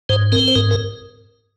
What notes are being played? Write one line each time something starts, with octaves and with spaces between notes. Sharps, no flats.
G#2 C5
C4 A#4
C5
G#2 A#4
A#4